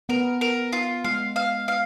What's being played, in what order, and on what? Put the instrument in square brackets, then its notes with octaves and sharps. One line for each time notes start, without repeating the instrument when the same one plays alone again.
[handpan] B3 [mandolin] A#4
[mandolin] A#4
F4
[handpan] G#3 [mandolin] F5
[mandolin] F5
F5